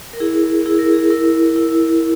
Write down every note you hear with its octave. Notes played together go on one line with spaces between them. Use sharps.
A#4
E4 G#4
E4 G#4
A#4
G#4
E4 A#4
E4